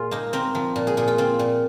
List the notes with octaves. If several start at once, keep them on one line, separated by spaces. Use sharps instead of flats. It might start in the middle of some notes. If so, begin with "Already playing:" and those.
Already playing: A#2 F4 G#4
A#3 D#4
C4 A#4
F3
A#2
G#4
A#2 G#4
F4
C4 F4
A#2